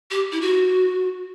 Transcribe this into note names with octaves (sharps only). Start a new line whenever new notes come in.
G4
E4
F#4